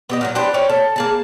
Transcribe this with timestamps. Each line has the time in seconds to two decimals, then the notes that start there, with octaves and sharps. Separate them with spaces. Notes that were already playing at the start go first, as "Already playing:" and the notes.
0.10 B3 G4 D#5
0.21 A#2 D#3 F#3
0.35 D4 G4 B4 C5
0.54 C#4 G4 C#5 D5
0.69 A4
0.96 A#3 G#4 A5